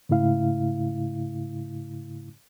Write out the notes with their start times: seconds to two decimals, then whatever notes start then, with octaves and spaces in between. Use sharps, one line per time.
0.09 G#2 C#3 A3 E4 F5